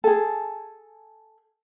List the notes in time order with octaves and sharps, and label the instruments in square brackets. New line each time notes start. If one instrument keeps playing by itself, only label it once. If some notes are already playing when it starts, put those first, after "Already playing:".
[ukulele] G#4 A4